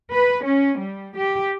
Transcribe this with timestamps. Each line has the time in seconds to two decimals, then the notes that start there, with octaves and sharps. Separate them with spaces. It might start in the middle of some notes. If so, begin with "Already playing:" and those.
0.12 B4
0.45 C#4
0.79 G3
1.17 G4